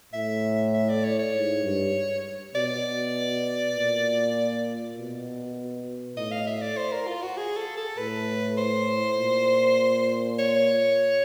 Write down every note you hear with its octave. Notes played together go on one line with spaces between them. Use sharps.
A2 E5
E5
D5
C#5
C#5
G#2
G2
B2 D5
A#2
B2
A2 D#5
F5
E5
D5
C5
A#4
F4
F#4
G#4
A4
A4
A2 B4
C5
A#2
C#5